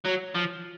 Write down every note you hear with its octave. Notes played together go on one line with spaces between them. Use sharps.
F#3
F3